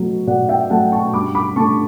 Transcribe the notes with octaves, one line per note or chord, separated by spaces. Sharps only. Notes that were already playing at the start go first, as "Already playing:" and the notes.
Already playing: B2 F#3 A3
B2 D5 F#5
E5 G5
F#3 A3 F#5 A5
A5 C#6
G2 B5 D6
B5 D6
D3 A3 A5 C#6